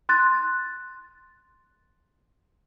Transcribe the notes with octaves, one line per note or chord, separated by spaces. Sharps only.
C6 F#6 A6